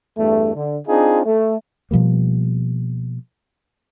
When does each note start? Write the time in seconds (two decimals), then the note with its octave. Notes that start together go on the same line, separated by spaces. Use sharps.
0.18 E2 G2 A3
0.55 D3
0.88 C4 D4 D#4 F4 G#4
1.26 A3
1.91 B2 F3 G3 A#3